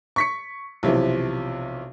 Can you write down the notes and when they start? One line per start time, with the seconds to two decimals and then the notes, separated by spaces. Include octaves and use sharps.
0.16 C#6 B6 C#7
0.83 B1 C3 E3 F3